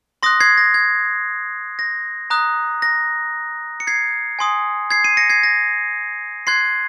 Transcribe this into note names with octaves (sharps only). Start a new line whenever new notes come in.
C6 D#6 F#6 A#6
G#6 C7
A#6
G#6
A#6
A#5 D#6 F#6
A#6
C#7
G#6 C7
G#5 C6 D#6
G#6 C7
C7 D#7
A#6 C#7
G#6 C7
A#6
C6 F#6 G#6 C7